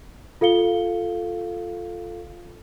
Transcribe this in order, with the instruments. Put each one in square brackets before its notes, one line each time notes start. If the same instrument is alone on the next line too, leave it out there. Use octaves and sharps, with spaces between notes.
[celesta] F4 A4 F5 C#7 G7